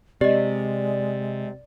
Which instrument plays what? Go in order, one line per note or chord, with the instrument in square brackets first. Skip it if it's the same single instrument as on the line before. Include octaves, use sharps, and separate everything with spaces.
[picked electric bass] C3 [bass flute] G#3 [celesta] G4 D#5 [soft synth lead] D5